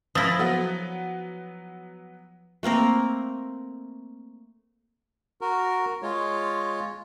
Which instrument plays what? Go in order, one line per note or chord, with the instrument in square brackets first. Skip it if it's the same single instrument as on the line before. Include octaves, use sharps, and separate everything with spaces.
[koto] F3 E4 [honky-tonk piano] D#6 A6 A#6
[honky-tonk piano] F#3 B3
[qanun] A3 A#3 C4 A#4
[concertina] F#4 A#4
G#3 F4 C#5